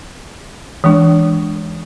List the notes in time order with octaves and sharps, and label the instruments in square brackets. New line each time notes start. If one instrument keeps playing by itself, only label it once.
[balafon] E3 G#3 D4